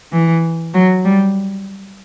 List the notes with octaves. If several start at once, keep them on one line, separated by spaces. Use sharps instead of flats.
E3
F#3
G3